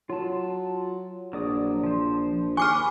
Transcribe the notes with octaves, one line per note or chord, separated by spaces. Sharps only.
F#3 F4 A5
A#1 F#3 D5 D#6
F3 C5
D#2 G#5 B5 C#6 D6 F6